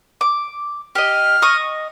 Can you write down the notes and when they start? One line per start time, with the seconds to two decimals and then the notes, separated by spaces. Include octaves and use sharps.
0.21 D6
0.95 G4 D#5 F6
1.42 D#5 C#6 D#6